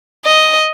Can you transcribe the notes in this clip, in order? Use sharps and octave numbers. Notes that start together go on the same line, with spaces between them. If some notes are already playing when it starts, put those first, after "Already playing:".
D#5